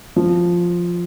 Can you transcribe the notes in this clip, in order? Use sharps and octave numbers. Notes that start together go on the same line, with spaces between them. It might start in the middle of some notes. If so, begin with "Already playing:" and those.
F3